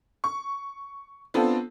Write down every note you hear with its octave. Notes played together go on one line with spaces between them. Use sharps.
C#6
B3 C4 D4 F4 A4